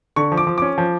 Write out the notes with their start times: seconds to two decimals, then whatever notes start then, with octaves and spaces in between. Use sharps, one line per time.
0.16 D3 C#6
0.32 F3
0.37 D6
0.47 F3
0.58 C#4 D6
0.78 F3